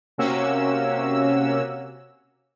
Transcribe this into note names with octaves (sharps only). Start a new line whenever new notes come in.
C3 A#3 C#4 F#4 E6